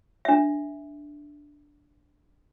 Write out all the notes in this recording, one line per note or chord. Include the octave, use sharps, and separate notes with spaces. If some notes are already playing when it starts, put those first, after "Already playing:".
D4 E5